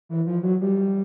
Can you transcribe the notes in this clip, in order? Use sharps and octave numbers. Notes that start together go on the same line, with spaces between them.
E3
F3
F#3
G3